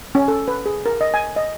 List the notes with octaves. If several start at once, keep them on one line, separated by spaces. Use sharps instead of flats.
C#4
A4
B4
G#4
A#4
D#5
G#5
D#5